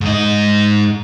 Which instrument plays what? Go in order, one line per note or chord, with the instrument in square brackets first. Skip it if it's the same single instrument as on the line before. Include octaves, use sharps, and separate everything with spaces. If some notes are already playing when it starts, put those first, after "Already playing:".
[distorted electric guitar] G#2 D#5